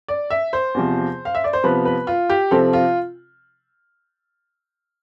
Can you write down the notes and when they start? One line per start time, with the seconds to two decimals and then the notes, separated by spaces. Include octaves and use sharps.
0.08 D5
0.30 E5
0.53 C5
0.74 E2 C3 F3
1.25 F5
1.35 E5
1.44 D5
1.53 C5
1.63 C3 F3 B3 B4
1.85 B4
2.07 F4
2.30 G4
2.51 C3 F3 C4 A4
2.73 F4